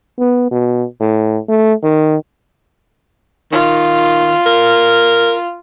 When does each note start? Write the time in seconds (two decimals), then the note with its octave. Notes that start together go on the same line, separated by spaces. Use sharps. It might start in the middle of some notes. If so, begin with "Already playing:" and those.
0.19 B3
0.51 B2
1.00 A2
1.49 A3
1.83 D#3
3.52 D#3 F4
4.46 A#4